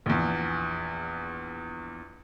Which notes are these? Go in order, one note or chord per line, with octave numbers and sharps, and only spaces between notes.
A#1 E2